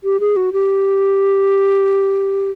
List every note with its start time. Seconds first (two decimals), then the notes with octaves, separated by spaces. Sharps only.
0.04 G4
0.20 G#4
0.36 F#4
0.53 G4